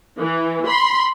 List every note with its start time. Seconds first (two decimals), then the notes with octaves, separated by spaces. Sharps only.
0.20 E3
0.67 B5 C6